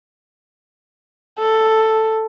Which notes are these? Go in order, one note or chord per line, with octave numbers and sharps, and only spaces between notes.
A4